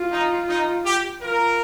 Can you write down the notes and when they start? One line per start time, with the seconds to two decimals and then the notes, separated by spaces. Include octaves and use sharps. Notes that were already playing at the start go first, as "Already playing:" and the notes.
Already playing: F4
0.11 D#4
0.49 D#4
0.85 G4
1.22 F4 A#4